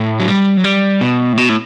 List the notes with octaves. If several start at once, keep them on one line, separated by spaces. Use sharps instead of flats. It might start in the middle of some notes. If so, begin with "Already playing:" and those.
Already playing: A2
F#3
G3
F#3
G3
B2
A2
B2
A2